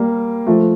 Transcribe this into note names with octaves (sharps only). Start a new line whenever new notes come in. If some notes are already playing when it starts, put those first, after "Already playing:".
Already playing: G3 A#3
F3 A3